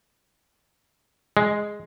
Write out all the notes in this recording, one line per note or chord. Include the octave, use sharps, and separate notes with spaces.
G#3